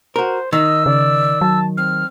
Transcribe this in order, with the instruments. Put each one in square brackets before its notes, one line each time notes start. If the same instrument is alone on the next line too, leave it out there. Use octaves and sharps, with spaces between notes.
[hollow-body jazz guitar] F#4 A#4 [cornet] C5
[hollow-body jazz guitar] D#3 [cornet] D#5 [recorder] E6
[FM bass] C#3 [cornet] D5
[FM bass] F#3 [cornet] A5
[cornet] C4 [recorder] F6